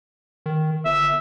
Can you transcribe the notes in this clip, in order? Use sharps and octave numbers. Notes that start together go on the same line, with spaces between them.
D#3
G1 E5